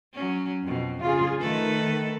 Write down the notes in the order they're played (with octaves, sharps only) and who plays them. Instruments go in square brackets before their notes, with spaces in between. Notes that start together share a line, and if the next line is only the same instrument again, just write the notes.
[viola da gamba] F#3 C#4
F2 B2
[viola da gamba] C#3 [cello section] F4 G#4
[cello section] D#3 [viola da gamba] A3 A4 B4